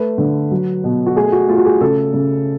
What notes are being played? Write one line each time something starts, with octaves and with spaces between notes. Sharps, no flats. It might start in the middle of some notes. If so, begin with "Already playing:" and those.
Already playing: A3 B4
D3
F#3
B2
F#4
A3 G#4
F#4
A3 F4
F#4
G#4
C#3 A4
C#3